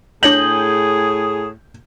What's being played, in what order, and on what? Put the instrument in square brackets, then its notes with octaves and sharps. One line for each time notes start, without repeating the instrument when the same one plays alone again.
[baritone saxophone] A2 [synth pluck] D4 C#5 A#6 [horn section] G#4 [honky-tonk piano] G6 F#7